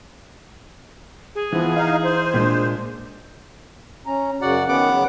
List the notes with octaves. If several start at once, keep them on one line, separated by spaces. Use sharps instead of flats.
G#4
E3 F3 B3
D#4 F5
C5
A#2 G#3 D4
C#4 A#5
F#2 C#3 F#4 D5 F#5
D#3 B3 C#4 F#5 D6
C#3 F#3